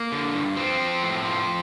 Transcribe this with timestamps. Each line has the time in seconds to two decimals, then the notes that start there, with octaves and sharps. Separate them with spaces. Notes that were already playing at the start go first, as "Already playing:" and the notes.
Already playing: A#3
0.12 D3
0.34 G2
0.57 F3 C4
0.80 F3
1.03 A2
1.25 F3